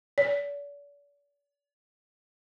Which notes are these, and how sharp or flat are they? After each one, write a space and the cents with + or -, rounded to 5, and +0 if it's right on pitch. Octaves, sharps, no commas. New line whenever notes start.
D5 -45